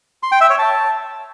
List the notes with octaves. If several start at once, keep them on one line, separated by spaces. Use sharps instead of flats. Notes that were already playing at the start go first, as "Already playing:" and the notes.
C6
G5
E5
C#5
A5